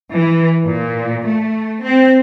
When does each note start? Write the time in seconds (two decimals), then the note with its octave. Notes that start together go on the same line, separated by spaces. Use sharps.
0.14 E3
0.65 A#2
1.26 A3
1.83 C4